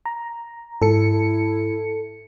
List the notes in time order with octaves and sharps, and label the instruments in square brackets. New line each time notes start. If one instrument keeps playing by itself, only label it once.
[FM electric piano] A#5
[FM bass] G#2 [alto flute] E4 [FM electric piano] A4 C#7